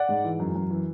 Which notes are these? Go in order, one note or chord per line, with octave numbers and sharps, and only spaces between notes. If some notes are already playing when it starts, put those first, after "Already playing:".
Already playing: D5 F#5
G#2
E3
F#2
F#2
E3